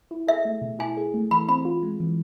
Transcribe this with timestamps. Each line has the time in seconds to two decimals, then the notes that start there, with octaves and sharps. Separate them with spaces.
0.11 E4
0.27 G#4 E5
0.45 A3
0.62 B2
0.79 E4 G#5
0.97 G#4
1.14 A3
1.31 E3 B5
1.49 C4 B5
1.65 F4
1.83 G#3
2.00 E3